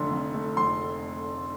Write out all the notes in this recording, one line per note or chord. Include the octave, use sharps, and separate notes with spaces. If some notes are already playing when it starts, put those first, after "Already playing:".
Already playing: F1 F2 D3 A3 C6
F2
A3
F1 C6